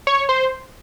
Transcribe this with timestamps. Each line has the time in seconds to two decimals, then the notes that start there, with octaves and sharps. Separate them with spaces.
0.07 C#5
0.29 C5